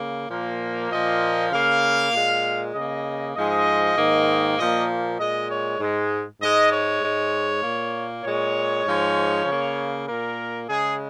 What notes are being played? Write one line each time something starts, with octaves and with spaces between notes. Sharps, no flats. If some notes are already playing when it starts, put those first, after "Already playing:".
Already playing: C#3 A#3
A#2 F3 A#3
A#2 F3 A#3 D#5
C#3 A#3 F5
A#2 G#3
C#3 A#3 D#5
G#2 F3 G#3 D#5
G#2 D#3 A#3
A#2 F3 A#3 D#5
A#2 G#3 D#5
C#5
G#2 G#3
G#2 G#3 D#5
C#5
G#2 G#3
A#2 A#3
A#2 G#3 C#5
G#2 F3 G#3
C#3 A#3
A#2 A#3 A#4
C#3 G#3 G#4